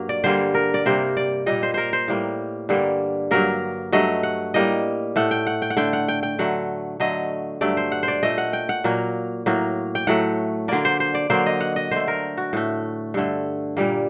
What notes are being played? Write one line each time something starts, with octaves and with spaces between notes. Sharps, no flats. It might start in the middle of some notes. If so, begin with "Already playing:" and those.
Already playing: G2 F#3 A#3
D5
D3 G3 A#3 C5
A#4
D5
C3 G3 A#3 C5
D5
A#2 G3 A#3 D#5
C5
A#4 C5
C5
A2 G3 A#3
G2 D3 G3 A#3
G2 F#3 A#3 A#4
G2 F#3 A3 D#5
F#5
A2 G3 A#3 D#5
A2 A3 F#5
G5
F#5
G5
F#5
D3 A3 G5
F#5
G5
G5
D3 F#3 A3 F#5
D3 F#3 A3 D#5
G2 F#3 A3 D5
C5
F#5
C5
D5
A#2 A3 D#5
F#5
G5
F#5
A#2 F#3 A#3
A2 F#3 A#3
G5
A2 F#3 A3 F#5
D3 F#3 A#3 D5
C5
C5
D5
D3 F#3 A#3 C5
D#5
F#5
D#5
D3 A3 C5
A#4
F#4
A2 A3
G2 D3 A3
A#2 G3 A#3